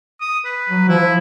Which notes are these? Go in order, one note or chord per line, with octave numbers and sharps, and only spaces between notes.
D#6
B4
F#3
F3 E4